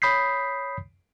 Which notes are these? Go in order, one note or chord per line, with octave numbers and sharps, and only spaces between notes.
C#5 B5 D#6 G6 B6 C7